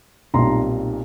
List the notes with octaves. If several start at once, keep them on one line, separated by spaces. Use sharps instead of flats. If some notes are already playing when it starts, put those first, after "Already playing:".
B1 A#2 G3 C4 D#4 A#5 C6